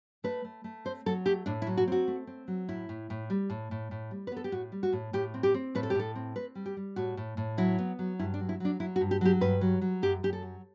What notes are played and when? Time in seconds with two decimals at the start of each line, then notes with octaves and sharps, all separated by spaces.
0.24 A3 B4
0.45 A3
0.64 A3
0.85 C4 C5
1.06 F#3 A4
1.26 A3 G4
1.46 A2 D4
1.62 E4
1.67 F#3
1.77 F#4
1.87 C4 F#4
2.08 A3
2.27 C4
2.48 F#3
2.68 A2 E4
2.89 A2
3.10 A2
3.30 G3
3.50 A2
3.71 A2
3.91 A2
4.11 G3
4.27 B4
4.32 B3 A4
4.44 G4
4.52 A2 F#4
4.72 G3
4.83 F#4
4.93 A2
5.13 A2 G4
5.34 C4
5.43 G4
5.54 C4
5.75 A2 B4
5.83 A4
5.90 G4
5.95 A2 A4
6.15 C4
6.36 C4 B4
6.55 G3
6.66 G4
6.77 G3
6.96 A2 F#4
7.17 A2
7.37 A2
7.58 F#3 E4
7.79 B3
7.99 F#3
8.19 G2 E4
8.34 D4
8.40 F#3
8.49 E4
8.60 F#3 D4
8.80 F#3 E4
8.96 F#4
9.01 G2
9.11 G4
9.21 F#3 G4
9.41 G2 B4
9.61 F#3
9.81 F#3
10.02 F#2 G4
10.23 F#2 G4
10.33 A4
10.43 F#3